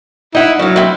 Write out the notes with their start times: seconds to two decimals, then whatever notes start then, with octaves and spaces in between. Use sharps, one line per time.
0.35 D#4 E4 F#5
0.59 F#3 C#4 F5
0.76 C4 E4